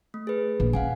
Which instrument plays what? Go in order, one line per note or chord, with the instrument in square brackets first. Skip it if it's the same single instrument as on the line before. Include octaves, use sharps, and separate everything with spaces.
[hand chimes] A3
G#4 B4
[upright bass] A#1
[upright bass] C#4 [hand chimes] F5 F#5 G#5